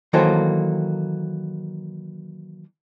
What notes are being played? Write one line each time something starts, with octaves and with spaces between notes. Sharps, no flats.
D#3 E3 F#3 A#3 A4 C5